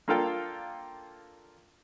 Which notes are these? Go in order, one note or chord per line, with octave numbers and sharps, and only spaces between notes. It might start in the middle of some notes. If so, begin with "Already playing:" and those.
A#3 D4 F4 A4 F5 G5